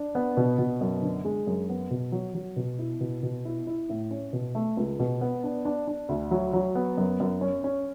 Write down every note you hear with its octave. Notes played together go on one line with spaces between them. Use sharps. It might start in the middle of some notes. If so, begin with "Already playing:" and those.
Already playing: D4
B3
B2
B2
F#2
D3
G#3
F#2
B3
B2
F#3
F#3
B2
E4
B2
B2
E4
E4
A2
C#4
B2
A3
C#2
B2
B3
D4
D4
D4
D2
F#3
F#3
B3
F#2
F#2
C#4
C#4